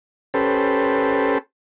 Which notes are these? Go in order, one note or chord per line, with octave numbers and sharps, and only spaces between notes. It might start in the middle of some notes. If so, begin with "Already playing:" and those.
C#4 G4 A4 B4 C5